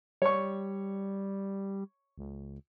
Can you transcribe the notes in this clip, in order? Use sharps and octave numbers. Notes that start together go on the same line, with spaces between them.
G3 C#5 C#6
C#2